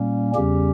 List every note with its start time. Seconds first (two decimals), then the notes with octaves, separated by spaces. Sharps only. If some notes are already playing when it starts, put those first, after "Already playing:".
Already playing: A#2 G3 A#3 C#4
0.35 E2 C#3 G3 C#4 G4